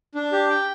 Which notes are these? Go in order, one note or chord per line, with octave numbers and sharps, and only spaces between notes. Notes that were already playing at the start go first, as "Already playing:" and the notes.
D4
G4
G5